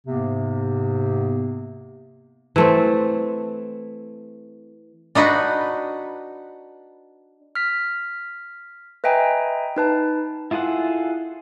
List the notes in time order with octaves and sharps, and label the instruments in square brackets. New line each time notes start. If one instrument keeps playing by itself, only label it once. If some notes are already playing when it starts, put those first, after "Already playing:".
[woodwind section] G#2 C3 A#3 B3
[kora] E3 A3 C4
[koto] D4 D#4 F#4 B4
[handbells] F6 B6
B4 D#5 E5 G5 G#5 A#5
D#4 B4 A5
[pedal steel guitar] E4 F4 G#4 A4 F#5